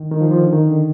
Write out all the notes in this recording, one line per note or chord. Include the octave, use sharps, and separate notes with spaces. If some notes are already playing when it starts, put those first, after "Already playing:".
Already playing: D#3
D#3
F3
F3
D3
D#3
D3